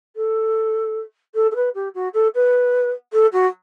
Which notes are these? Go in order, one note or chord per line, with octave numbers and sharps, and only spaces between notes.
A4
A4
A4
B4
G4
F#4
A4
B4
A4
F#4